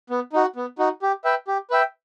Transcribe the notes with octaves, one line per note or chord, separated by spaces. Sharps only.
B3
D#4 F#4
B3
D#4 F#4
G4
B4 E5 G5
G4
B4 E5 G5